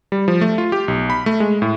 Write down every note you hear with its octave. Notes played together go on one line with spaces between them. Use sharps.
G3
F3
A3
F4
G4
B1
B5
A3
G#3
A2